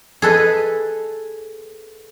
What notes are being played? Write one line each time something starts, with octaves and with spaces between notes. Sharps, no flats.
G#4 A4 B4 D#5